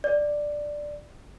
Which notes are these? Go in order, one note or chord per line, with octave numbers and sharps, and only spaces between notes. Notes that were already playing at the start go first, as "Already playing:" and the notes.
D5